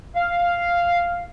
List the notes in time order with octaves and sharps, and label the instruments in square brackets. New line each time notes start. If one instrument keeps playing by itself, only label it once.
[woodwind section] F5